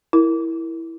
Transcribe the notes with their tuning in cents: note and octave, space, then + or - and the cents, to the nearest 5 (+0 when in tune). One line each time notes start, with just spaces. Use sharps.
E4 +0 A#4 +0